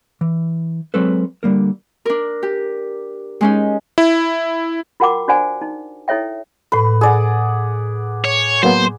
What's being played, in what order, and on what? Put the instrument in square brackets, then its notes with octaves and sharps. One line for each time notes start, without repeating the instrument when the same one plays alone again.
[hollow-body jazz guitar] E3
F#3 G#3 C4 A4 B4
D3 G3 A#3 A#4
[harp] D4 A#4
G4
G#3 C#4 D#4
[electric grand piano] E4
[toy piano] F4 F#4 A#4 F#5 G5 D6
D4 F#4 C5 D5 F#5 G#5
D#4
E4 A4 C#5 E5 G5
[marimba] A2 B5 [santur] B4
[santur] G#4 D5 F#5
[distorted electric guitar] C#5
[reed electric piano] F#3 A#3 B3 [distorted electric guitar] C5